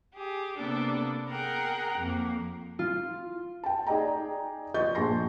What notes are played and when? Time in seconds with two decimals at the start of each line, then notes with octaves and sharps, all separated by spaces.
0.14 G4 G#4
0.57 C3 A#3 B3 D4 A4
1.29 G#4 A#4 F#5 G5 A#5
1.99 F2 A#3
2.79 F4
3.64 G5 A5
3.87 D#4 G#4 D5 D#5 G5 A#5
4.74 F3 D#5 C#6 G6 A6
4.95 A#1 G#4 A5 C6 A#6